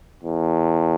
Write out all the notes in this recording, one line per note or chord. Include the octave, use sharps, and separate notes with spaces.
E2